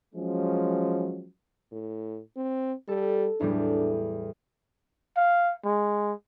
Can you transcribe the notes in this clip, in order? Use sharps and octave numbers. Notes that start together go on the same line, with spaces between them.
F3 F#3 G#3 C#4
A2
C4
G3 A4
E2 A2 G3 D4
F5
G#3